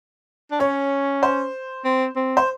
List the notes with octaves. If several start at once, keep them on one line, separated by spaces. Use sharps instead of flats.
D4
C#4 C#5
C5
C4
C4
C5